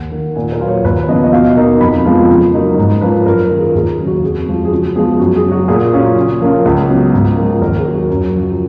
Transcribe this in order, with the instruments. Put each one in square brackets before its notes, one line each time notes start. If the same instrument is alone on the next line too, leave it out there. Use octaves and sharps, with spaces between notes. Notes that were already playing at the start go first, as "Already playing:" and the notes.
Already playing: [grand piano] D#2 F#5
D#3 A#3
A#2 G#5
A#4
F#3 A#3 F4 B4
C#5
D#2 B4
C#3 F3 B3 D#5
D#5
B2 F5
A#3 D#4
F2 B5
F3 G#3 B3 F4
C#3
F#3 A#3 D#4
G#2
F3 A#3 C#4 F4 B4
F#2 A#4
D#3 A#3 F4
G#4
D#2 G#4
C#3 F#3
F#4
F2 G#4
F3 G#3
G#4
C#3 F#4
F3 G#3 B3 G#4
F#2 F#4
G#4
C#3
F#3 F#4
A#2 G#4
F#3 C#4 F4
C#3
F3 A#3 C#4 F4
C#2
C#3 F#3 B3
G#2
F3 A#3
D#2 A#4
G#4
D#3 F#3
F#4
F#2
C#3 F3